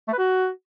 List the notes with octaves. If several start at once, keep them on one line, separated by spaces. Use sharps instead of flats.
A3
B4
F#4